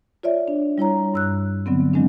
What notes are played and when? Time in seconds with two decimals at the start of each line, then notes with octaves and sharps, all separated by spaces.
0.23 F4 C#5 D5 E5
0.48 D4
0.78 G3 E4 C#5 A#5
1.14 G2 E6 F#6
1.66 D3 F#3 B3 C4
1.93 D#3 F#3 G#3 C4 D4